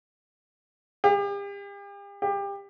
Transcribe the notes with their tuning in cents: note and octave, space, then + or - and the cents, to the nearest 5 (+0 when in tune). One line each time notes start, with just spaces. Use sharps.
G4 +40
G4 +25